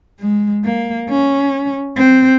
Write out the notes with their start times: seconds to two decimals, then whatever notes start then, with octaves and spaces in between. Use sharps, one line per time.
0.20 G#3
0.64 A#3
1.09 C#4
1.97 C4